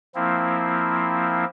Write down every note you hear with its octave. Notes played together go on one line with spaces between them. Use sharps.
F3 A#3 C4 E4